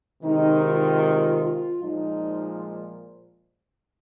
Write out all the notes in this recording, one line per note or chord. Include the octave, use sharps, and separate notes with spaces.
C3 D#3 G#3 D#4
F4
F4
F4
A#2 F3 G#3 D#4